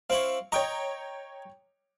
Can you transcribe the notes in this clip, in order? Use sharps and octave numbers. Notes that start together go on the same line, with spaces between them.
C4 E4 C#5 F5
C#5 D#5 G5 A#5 C#6